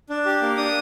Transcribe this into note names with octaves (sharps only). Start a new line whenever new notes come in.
D4
G4
A#3
D4 D#6